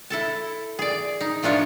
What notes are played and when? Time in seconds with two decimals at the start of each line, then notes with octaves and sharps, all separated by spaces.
0.10 E4 A4 A5
0.79 G#4 D5
1.21 D#4
1.43 F3 A3 D4 F4 C#5